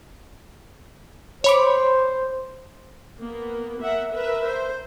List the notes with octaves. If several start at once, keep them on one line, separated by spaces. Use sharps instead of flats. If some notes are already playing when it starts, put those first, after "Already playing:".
C5 C#5 B5 D6
A#3 B3
A#4 E5 F#5
A#4 B4 E5
C5